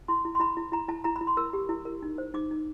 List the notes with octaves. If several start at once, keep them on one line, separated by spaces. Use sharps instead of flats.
E4 C6
E4
C6
E4 B5
E4
E4 A#5
E4 A5
E4 A#5
B5
E4
C6
A#4 E6
G4
E4
A#4
D#4
C5
D#4 D6
D#4